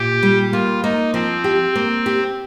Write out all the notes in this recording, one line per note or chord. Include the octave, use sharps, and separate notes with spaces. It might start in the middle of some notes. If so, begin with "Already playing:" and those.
Already playing: A#2 G4
G3
A#3 F4
A#3 D#4
F3 C4
G4
A#3
G4